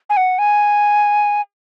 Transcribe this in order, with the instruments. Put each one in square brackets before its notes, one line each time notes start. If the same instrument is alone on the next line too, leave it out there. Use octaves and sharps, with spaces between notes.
[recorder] G#5
F#5
G#5